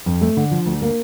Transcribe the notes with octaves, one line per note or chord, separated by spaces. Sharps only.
F2
A3
D3
F3
D2
A#3